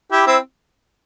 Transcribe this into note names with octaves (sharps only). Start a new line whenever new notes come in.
E4 G4
C4 E4